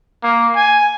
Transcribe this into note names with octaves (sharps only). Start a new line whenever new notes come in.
A#3
G#5